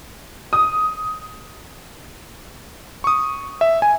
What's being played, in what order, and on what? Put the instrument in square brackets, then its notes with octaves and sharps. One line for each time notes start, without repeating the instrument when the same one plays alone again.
[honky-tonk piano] D#6
[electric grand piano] C#6 D#6
E5
G#5